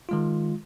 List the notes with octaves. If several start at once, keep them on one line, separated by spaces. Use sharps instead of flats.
D#3 G#3 F4